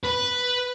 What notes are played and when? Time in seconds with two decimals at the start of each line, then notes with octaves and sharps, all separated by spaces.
0.05 B4